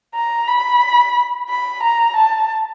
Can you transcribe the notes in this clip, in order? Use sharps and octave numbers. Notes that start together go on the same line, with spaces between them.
A#5
B5
B5
A#5
A5